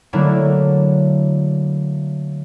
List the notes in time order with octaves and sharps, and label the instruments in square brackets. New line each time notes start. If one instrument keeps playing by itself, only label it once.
[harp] D3 F#3 A3 A#3 D4 E4